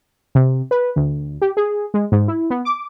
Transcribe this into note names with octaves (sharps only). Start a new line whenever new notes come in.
C3
B4
D2
G4
G#4
G#3
G#2
E4
B3
D6